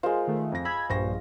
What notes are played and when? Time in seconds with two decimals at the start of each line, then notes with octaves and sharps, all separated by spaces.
0.03 G#3 F4 A#4 C5
0.27 D#3 A3
0.52 F2 A#6
0.65 B5 E6 G#6
0.89 A#1 G2 C5 C#6 A#6